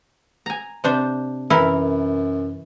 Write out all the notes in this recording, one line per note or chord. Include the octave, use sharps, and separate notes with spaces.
G#5 A#5
C3 D4 C5
F#2 E3 E4 A#4